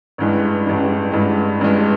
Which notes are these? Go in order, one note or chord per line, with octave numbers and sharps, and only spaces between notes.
A1 G2 E3 G#3
A1 G2 E3 G#3
A1 G2 E3 G#3
A1 G2 E3 G#3